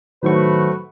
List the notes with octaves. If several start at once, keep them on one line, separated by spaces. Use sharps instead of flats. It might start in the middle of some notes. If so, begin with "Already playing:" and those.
A2 D#3 F#3 A3 F#4 B4 C5 C#6